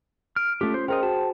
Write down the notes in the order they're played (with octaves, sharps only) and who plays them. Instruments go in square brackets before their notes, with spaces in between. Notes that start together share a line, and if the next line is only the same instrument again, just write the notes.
[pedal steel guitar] F6 [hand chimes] D7
[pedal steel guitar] A3 G4 [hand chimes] C#4 F4
[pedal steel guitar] C5
[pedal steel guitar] F4 A#4 D#5 [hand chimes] G#4 C5 G5
[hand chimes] F#4 [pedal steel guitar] A5